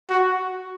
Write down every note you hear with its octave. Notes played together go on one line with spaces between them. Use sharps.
F#4